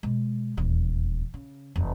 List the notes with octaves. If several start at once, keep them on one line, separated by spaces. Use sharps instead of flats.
B2 G#3
D#1 E2
C#3
F1 E2